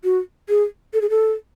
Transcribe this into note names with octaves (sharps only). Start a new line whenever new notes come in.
F#4
G#4
A4
G#4
A4